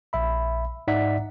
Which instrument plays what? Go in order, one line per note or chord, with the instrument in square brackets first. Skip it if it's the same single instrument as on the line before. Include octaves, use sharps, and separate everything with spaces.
[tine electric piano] A#1 E5 B5
G#2 D#4 D5 E5 F#5 B6